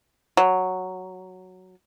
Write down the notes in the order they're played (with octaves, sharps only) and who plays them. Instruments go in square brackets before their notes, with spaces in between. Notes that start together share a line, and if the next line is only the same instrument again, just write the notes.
[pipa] F#3